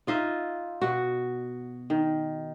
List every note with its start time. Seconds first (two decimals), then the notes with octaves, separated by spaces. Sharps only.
0.07 D#4 F4 D#5 E5
0.82 B2 F#4
1.90 D#3